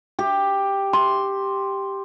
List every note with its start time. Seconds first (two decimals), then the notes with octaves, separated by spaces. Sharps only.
0.19 G4
0.93 C6